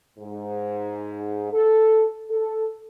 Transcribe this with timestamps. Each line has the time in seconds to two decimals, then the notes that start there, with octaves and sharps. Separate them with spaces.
0.19 G#2
1.52 A4
2.29 A4